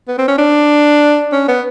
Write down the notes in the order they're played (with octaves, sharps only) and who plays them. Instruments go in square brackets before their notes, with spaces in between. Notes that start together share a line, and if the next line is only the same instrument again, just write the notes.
[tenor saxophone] B3
C4
C#4
D4
C#4
B3